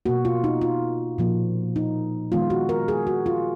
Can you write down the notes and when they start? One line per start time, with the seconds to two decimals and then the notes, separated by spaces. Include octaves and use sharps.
0.06 B2 A#3 F#4
0.25 F4
0.44 D#4
0.61 F4
1.18 A#2 F3 A#3
1.76 D#4
2.32 D#3 G#3 B3 F4
2.50 F#4
2.69 A#4
2.88 G#4
3.07 F#4
3.26 F4